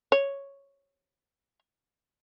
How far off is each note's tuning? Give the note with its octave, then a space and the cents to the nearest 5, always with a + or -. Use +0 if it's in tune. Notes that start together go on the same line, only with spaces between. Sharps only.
C#5 +0